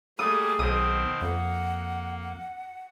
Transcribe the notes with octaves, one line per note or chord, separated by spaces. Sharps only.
G3 A3 A#3 G#4 D#6
B1 B2 D#3 C4 D#6
F2 A#3 F#5